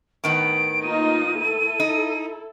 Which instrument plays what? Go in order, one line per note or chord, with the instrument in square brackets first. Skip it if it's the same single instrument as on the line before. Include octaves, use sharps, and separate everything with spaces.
[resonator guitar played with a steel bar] A2 D#3 B3 [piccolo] D7
[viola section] A#3 D#4 F4 [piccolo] D#7
[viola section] E4 A4
[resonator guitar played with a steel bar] D#4